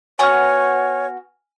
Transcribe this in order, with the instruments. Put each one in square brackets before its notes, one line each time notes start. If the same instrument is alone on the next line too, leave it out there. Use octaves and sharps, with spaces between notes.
[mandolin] B3 F#4 C#6 [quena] C#5 [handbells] G#5 F6